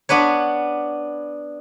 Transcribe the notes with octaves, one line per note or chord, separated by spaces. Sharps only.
B3 D4 B4 C#5